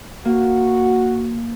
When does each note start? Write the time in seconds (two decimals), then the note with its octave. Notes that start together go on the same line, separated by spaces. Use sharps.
0.25 A#3 F#4